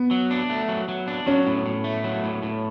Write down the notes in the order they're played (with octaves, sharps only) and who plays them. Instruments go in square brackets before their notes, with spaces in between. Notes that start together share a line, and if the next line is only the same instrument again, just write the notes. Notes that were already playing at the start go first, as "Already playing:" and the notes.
Already playing: [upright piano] B3
[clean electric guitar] F#3
D4
A3
F#3
F#3
D4
[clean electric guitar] F#3 [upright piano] C#4
[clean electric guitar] A2
A2
A3
F#3
A2
A2